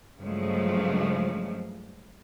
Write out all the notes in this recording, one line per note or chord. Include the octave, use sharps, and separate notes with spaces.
G2 C#3 F3 F#3 G#3 A3